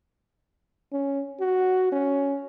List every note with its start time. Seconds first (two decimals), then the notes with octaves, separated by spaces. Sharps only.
0.92 C#4
1.40 F#4
1.92 C#4